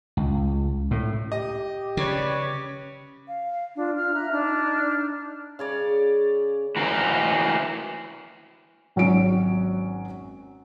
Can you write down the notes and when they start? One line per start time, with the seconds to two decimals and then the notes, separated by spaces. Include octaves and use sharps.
0.17 C#2
0.91 A2
1.32 G4 D#5
1.97 C#3 B4 C#5 D5
3.28 F5
3.77 D4 F4
3.97 D4 F4 F6
4.14 E5 A#5 F6 F#6
4.31 D4 D#4 F6
5.59 C#3 C#5 D5
6.76 E3 F#4 A#4
8.96 G#1 F#3 C#4 F#4 D7